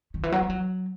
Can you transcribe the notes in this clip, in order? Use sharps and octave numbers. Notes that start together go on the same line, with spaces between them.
D#3
E3
F#3
G3
F#3